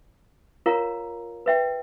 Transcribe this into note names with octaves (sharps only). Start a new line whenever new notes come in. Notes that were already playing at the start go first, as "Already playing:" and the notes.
F4 A#4 C#5 F5 A#5
B4 E5 G5